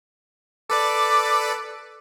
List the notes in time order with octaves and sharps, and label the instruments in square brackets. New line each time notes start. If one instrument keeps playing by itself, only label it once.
[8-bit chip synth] A4 B4 D5 [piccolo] D6